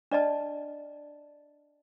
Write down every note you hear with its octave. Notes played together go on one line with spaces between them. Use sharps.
D4 D5 D#5 A5